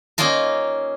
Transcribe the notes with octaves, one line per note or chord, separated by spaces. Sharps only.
A#3 C#4 D#4 F4 A#4